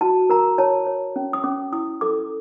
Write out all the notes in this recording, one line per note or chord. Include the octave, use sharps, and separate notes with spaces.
F#4 A5
A#4 A#5
C#5 A5
C#5
C#4
D#6
C#4 D6
E4 D#6
A4 D6